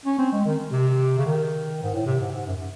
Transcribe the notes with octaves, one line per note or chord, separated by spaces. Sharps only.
C#4
C4
G#3
D#3
C3
C#3
D#3
G#2
A2
C3
G#2
G#2
F#2